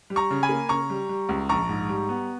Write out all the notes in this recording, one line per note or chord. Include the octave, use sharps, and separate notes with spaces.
G3
A#5 C#6
C#3
G#5 B5
A#3
C#3 A#5 C#6
G3
G3
C#2
A#1 A#5 C#6
G#2
G3
B3